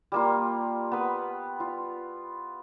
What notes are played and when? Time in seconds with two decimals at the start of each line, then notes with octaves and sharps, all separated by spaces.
0.12 G3 A#3 F4
0.92 B3 B4
1.60 F4